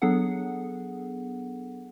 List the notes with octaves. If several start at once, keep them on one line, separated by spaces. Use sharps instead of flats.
F#3 B3 D4 G#4 A4 F#5